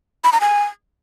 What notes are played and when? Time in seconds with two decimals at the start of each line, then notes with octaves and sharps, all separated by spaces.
0.24 B5
0.32 A#5
0.41 G#5